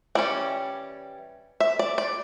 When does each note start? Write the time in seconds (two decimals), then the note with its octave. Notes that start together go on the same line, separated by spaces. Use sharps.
0.15 E3 G3 C#4 D5
1.60 E5
1.79 D5
1.98 D5